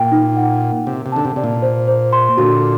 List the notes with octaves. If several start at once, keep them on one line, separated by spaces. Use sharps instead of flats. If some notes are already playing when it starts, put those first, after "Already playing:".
Already playing: A#2 G5
D#4
F#5
A#4
C3 D#4
C3
D3 A5
C3
C3 D5
A#2
C5
C5
C6
A#2 D3 F#4